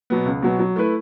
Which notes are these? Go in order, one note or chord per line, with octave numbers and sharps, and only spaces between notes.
B2 F#3 B3
C#2
B2 F#3 B3
F#3
A3 E4 B4